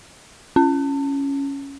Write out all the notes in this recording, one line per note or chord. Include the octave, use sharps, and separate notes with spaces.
C#4